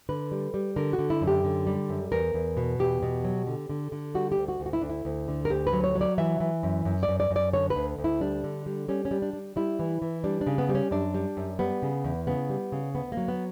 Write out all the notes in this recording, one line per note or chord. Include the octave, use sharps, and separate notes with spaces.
D3 B4
G3
G3
D3 A#4
F#4
D3
E4
F#2
G4
D3
G3
F#2
E2 A#4
E2
B2
E2 G4
B2
F#3
D3
D3
D3
G3 F#4
G4
D2
F#4
D2
F#4
E4
D2 D4
E4
D2
D3
A#4
D2 G4
B4
F#3
C#5
F#3
D5
E3 E5
E3
F#2
F#2
D5
F#2
D5
F#2
D5
D3 C#5
B4
D2
D2
E4
G3 D4
D3
G3
G3 C#4
C#4
G3
D4
G3
G3 E4
E3
E3
G3 D4
D4
C#3
B3
G3
C#4
F#2 D4
G3
F#2
G3 B3
C#3
E2
C#3 B3
G3
C#3
D2 B3
A#3
F#3
B3